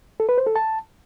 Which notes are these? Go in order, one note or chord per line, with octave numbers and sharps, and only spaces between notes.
A4
B4
C5
A4
A5